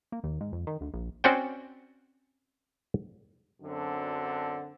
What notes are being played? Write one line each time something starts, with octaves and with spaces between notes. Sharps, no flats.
A#3
D#2
G#2
F2
D#3
D2
A#1
C4 C#4 F#4 C5 D5 G5
F#2 D3 F#3 C4 D4